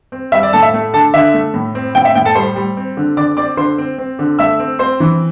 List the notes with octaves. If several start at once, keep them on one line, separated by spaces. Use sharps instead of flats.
C4
G3 E5 E6
D5 D6
A2 A4 A5
E5
A3
D3 A4 A5
D3 E5
A3
A2
C4
A2 G5
E5
A2 G5
A4 A5
G3 C5 C6
G3
C4
D3
D3 D5 D6
C4 D5 D6
D3 C5 C6
C4
C4
D3
A3 E5 E6
C4
C4 C5 C6
E3